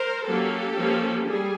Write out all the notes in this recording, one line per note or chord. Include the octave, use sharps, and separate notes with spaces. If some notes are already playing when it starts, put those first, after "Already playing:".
Already playing: A#4 C5
F#3 A#3 C#4 G4 A4
F3 A#3 C#4
G3 G#4